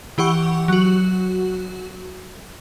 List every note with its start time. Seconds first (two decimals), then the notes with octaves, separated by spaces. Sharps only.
0.18 E3 G4 F#5 C#6
0.68 F#3 F#4